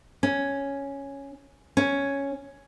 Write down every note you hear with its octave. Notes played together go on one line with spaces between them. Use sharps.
C#4
C#4